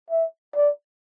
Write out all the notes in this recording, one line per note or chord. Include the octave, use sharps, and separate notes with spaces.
E5
D5